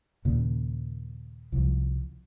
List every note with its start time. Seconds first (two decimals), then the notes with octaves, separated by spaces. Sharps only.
0.25 D#2 A#2 C#3
1.52 C2 F3